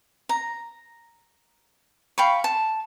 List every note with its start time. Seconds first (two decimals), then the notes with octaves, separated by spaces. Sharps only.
0.29 A#5
2.18 F5 G5 B5 C#6
2.44 A5